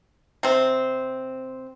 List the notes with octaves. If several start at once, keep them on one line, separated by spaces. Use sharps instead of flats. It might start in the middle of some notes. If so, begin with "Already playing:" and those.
C3 C4